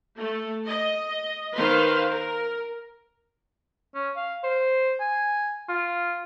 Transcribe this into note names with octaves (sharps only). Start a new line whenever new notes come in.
A3 A4
D#5
D#3 B4 C5 F5 C6
A#4
C#4
F5
C5
G#5
F4